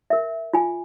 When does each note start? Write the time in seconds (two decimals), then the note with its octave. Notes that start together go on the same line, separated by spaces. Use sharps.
0.10 A#4 E5
0.53 F4 G#5